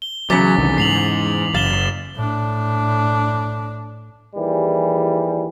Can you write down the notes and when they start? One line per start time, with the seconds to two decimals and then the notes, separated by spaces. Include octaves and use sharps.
0.02 G7
0.30 E2 C#3 F#3 D6 A6 B6
0.59 C2 D3 D#3
0.78 G#2 C7 F7 F#7
1.55 F#1 F5 A6 E7 G7
2.16 A2 D4
4.36 D#2 E3 G3 G#4